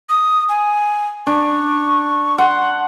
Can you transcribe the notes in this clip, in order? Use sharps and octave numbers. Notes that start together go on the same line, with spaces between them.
D#6
G#5
D4 C#6
F#5 C6